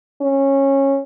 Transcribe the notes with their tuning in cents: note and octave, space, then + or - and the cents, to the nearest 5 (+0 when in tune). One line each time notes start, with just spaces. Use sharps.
C#4 -15